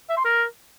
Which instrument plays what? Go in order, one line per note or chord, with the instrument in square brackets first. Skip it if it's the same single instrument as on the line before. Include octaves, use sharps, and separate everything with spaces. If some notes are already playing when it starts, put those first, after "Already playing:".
[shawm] E5
C6
A#4